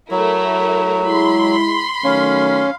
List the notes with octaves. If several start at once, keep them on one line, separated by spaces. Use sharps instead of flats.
F#3 A3 E4 A#4
G#3 E4 B5 C6
D#3 F#3 A3 C#4 F5